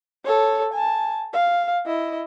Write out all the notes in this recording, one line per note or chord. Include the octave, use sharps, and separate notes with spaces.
A4 C#5
G#5 A5
F5
E4 D#5